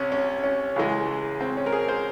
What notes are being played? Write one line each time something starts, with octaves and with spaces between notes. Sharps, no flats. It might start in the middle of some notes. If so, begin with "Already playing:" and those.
Already playing: C2 C3 C#4
C#4
C#4
C#2 C#3 E3 G#3
C4
C#4
A#4
G#4
C5